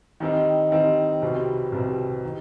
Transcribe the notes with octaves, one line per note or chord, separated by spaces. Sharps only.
D#3 G3 C4 D#4
D#3 G3 C4 D#4
C2 B2 G3 C4
C2 B2 G3 C4
D#3